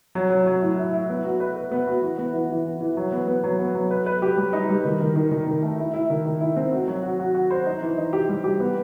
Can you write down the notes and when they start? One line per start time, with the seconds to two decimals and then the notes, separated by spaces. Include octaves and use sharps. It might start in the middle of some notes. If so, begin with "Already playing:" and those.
0.15 F#3
0.30 F#3
0.47 F#3
0.62 A2
0.77 E4
0.93 E4
1.09 B3
1.24 F#4
1.40 B4
1.56 B4
1.71 B3
1.87 F#4
2.02 E3
2.18 B3
2.33 E3
2.50 E3
2.65 E3
2.81 E3
2.97 F#3
3.12 B3
3.28 B3
3.43 F#3
3.59 B3
3.75 F#3
3.91 B4
4.06 B4
4.22 G4
4.37 G3
4.53 D#4
4.69 G3
4.85 D#3
5.00 D#3
5.16 D#3
5.31 D#3
5.47 D#3
5.63 A3
5.78 E4
5.93 E4
6.10 D#3
6.25 D#3
6.41 E4
6.56 C4
6.72 F#4
6.88 F#3
7.03 F#4
7.19 F#4
7.35 F#4
7.50 C5
7.66 D#4
7.82 E3
7.98 D#4
8.13 G4
8.29 G3
8.44 G4
8.60 B3